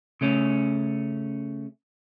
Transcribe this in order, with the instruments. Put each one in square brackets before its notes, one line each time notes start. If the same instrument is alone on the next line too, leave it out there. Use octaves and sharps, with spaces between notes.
[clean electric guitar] C#3 A3 C#4